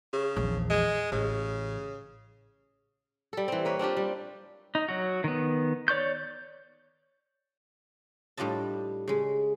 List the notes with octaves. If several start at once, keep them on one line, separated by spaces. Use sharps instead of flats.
C#3
A#1 E2
G#3
A1 C#3
G3 A4
E3 C4
A#3 B4 C#5
C4 D4 F4 G4
G3
D#4
F#3 F#4
D#3 B3
C#5 D5 C#6 G6
A2 G3 D4 F4 D#5 A5
C#3 G#3